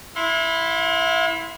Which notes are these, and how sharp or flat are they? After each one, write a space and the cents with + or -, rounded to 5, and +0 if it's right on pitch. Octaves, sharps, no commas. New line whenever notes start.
E4 +0 F5 +45 C6 +0